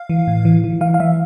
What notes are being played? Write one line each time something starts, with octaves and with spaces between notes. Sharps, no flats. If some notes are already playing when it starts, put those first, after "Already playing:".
Already playing: F5
E3
A2
E3
E3
E3 F5
F5
E3 E5